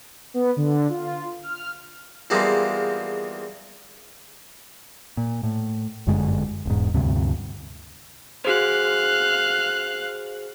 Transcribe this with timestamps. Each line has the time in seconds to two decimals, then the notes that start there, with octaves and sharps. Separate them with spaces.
0.34 B3
0.57 D3
0.89 F4
1.43 F6
2.30 E2 F3 G3 G#3 A#3 C4
5.17 A#2
5.43 A2
6.07 G1 F#2 D3 G#3
6.66 E1 G#2
6.94 D2 G2 C3
8.45 F#4 G#4 C5 F5 F#6